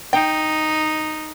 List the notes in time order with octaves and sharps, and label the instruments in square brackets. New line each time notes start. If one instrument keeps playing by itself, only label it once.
[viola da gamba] D#4 [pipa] G5